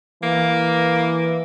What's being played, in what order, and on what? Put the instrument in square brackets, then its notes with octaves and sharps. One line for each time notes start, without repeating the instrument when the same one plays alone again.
[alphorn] E3 [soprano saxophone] A#3